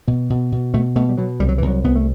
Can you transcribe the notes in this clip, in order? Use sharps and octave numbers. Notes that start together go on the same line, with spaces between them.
B2 B3
B2
B2
B2 A3
B2 A3
G3
B2 F#3
C2 G3
F#3
C2 E3
F#3
C2 B3
A3